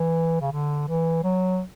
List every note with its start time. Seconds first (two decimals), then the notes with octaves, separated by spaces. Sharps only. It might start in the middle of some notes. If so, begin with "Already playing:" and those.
Already playing: E3
0.41 C#3
0.52 D3
0.88 E3
1.23 F#3